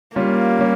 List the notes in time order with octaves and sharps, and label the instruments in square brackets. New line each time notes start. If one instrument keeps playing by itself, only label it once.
[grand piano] G3 C#4 F4 [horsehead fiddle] A#3
[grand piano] G3 C#4